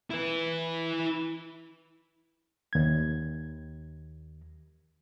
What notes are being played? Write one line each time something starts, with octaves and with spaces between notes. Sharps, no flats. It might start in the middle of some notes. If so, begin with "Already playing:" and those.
E4 B4
D#2 G#6